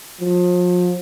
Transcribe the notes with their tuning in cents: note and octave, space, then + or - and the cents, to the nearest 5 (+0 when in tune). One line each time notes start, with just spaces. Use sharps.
F3 +35